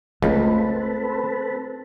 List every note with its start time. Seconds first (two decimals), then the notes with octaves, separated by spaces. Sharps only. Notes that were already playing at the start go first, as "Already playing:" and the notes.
0.22 C#2 A3 C4 F4 A4 B4